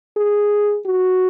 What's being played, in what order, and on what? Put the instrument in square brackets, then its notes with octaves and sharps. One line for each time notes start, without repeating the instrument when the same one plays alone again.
[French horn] G#4
F#4